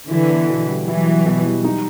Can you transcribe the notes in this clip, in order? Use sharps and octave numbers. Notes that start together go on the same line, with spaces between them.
D3 E3 E4
B3
B2
G3
E3 F#3 E4
B3
B2
G3
D#4